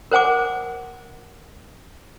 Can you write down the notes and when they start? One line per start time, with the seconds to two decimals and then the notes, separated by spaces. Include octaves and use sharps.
0.11 A#4 C5 F#5 G#5 D6